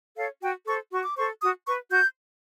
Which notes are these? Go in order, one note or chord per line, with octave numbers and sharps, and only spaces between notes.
A4 C#5 F5
F#4 G5
A4 C5 C#6
F#4 C#6
D6
A4 C5 C#6
F#4 D#6
B4 C#6
F#4 G6